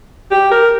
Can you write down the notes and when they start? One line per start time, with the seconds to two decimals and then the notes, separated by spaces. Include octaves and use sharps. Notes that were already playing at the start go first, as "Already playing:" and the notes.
0.31 G4
0.51 A#4